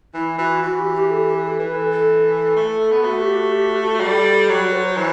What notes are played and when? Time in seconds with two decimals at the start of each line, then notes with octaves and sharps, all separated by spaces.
0.14 E3 E4
0.38 E3 F#4
0.62 E3 F#4
0.79 G4
0.90 F#4
0.94 G4
1.10 A4
1.27 G4
1.43 A4
1.59 E3 B4
1.75 A4
1.91 A4
2.56 A3
2.91 B3
3.03 A3 F#4
3.20 G4
3.36 F#4
3.52 G4
3.69 F#4
3.84 F#4
4.01 G3 A4
4.49 F#3 F#4
4.72 C5
4.97 E3